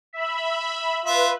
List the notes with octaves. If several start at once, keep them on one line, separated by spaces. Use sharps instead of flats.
E5 B5
F4 B4 E5